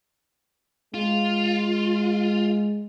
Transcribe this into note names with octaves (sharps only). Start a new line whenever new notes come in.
G#3 F4